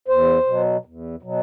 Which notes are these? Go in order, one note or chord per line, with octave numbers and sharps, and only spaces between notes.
E2 C5
B2 F#3
E2
B2 F#3